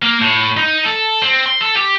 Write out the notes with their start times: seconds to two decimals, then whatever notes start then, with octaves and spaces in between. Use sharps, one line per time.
0.03 A#3
0.21 A2
0.57 D#4
0.85 A4
1.22 C4
1.46 C6
1.61 A4
1.77 G4